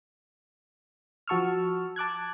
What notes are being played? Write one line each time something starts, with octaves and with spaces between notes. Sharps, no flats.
F3 F#4 A5 C#6 E6 F6
A5 D6 F#6 G#6